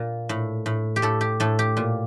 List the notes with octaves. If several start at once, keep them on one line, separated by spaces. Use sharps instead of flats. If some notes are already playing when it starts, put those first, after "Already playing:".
Already playing: A#2
A2
A2
G4
A2 A4
G4
A2 A4
G4
A#2